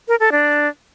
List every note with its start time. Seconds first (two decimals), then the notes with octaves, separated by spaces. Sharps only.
0.08 A#4
0.20 A4
0.32 D4